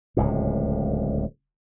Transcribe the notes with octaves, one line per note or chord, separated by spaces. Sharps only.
D1 C#2 A2